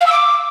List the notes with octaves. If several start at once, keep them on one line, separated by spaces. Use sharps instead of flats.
F5
E6
D6